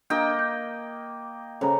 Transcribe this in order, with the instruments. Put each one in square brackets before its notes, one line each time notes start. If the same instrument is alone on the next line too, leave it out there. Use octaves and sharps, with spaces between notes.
[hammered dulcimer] A#3 D#5 G5 [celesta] D4
[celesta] G6
[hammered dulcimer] C#3 [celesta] A4 C5 A#5